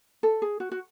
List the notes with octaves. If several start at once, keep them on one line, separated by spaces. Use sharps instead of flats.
A4
G#4
F#4
F#4